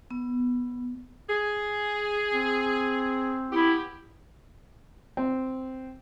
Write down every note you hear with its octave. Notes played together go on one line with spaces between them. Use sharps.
B3
G#4
C4
B3 E4 G4
C4